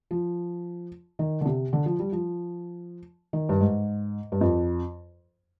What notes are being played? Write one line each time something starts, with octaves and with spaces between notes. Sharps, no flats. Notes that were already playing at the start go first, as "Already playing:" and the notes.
F3
D#3
D3
C3
D3
F3
G3
F3
D#3
G2
G#2
G2
F2